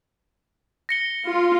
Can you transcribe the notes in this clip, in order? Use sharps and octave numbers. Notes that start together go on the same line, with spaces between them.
A#6 C#7 G7
F4